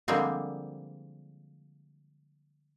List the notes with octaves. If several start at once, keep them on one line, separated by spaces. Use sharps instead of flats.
D3 F3 G3 G#3 A#3 C4